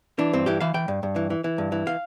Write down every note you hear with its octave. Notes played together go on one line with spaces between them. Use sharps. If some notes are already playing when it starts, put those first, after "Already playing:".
E3 D4
G2 C4
E3 G4
E3 F5
E3 G5
G2
G2
E3
E3
E3
G2
E3
F5